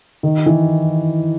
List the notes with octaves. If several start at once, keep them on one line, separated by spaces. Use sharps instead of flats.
D#3
E3